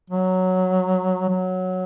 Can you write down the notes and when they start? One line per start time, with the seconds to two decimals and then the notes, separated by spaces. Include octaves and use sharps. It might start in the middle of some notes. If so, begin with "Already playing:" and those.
0.10 F#3
1.29 F#3